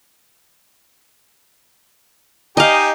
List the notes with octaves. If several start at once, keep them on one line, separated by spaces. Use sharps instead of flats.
D#4 G4 D#5 F5 G#5